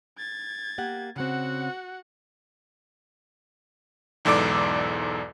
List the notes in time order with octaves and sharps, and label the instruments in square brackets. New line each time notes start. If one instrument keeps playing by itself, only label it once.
[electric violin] G#6 A6
[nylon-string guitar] A#3 G4 F#5
[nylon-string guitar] C#3 C4 [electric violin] F#4 F#5
[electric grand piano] B1 E2 G#2 A4 D5 D6